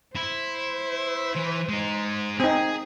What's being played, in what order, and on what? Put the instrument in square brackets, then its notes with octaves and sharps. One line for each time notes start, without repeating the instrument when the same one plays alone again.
[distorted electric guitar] E4 [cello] C5
[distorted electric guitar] E3 B4
G#3 D#4
[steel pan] C4 D#4 [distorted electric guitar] G#4